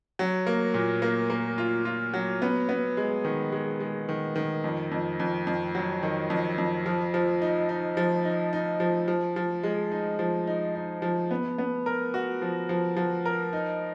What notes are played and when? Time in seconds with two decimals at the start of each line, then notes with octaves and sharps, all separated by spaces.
0.19 F#3
0.47 A#3
0.74 A#2
1.02 A#3
1.30 A#3
1.58 F4
1.85 F4
2.14 F#3
2.42 B3
2.69 B3
2.97 G#3
3.25 D#3
3.52 G#3
3.80 G#3
4.09 D#3
4.36 D#3
4.64 F2
4.92 F2
5.20 F2
5.47 F2
5.75 F#3
6.03 D#3
6.30 F2
6.58 F2
6.86 F3
7.14 F3
7.42 D#4
7.69 D#4
7.97 F3
8.25 D#4
8.53 D#4
8.80 F3
9.08 F3
9.36 F3
9.63 G#3
9.92 D#4
10.19 F3
10.47 D#4
10.75 D#4
11.02 F3
11.31 B3
11.58 B3
11.86 A#4
12.14 F#4
12.42 F3
12.69 F3
12.97 F3
13.25 A#4
13.53 D#4